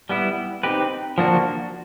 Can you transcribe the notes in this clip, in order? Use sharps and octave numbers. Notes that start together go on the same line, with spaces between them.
G3 B3 E4
C4 D#4 G4 B4
F3 A#3 D4 F#4